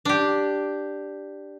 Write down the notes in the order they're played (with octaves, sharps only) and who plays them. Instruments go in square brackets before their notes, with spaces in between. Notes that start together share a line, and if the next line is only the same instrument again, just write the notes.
[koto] D4 G4